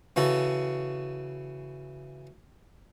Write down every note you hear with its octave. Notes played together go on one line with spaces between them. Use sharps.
C#3 E3 F#4 A4